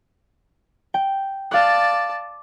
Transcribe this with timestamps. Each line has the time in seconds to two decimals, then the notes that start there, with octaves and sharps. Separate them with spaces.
0.94 G5
1.51 D5 F5 A5 F#6